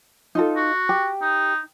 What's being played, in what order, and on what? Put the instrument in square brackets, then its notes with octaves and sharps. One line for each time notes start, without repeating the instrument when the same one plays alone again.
[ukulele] D#4 F4 A4
[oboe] F#4
[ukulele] G4
[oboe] D#4